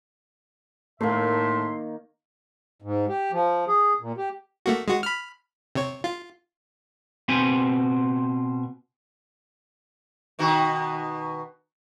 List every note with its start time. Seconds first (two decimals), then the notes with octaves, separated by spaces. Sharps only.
1.01 A2 D#3 A3 A#3 E5 C6
2.82 G#2
3.09 G4
3.32 F3
3.68 G#4
4.01 A#2
4.17 G4
4.66 A3 A#3 F#4
4.88 G#3 F#4
5.03 B5 F6
5.75 C3 C#5
6.04 F4
7.28 B2 C4 C5 G#5
10.39 B2 D#3 F#4